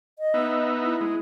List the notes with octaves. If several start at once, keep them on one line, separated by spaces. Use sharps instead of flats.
D#5
B3 D#4 E5
E4
G#3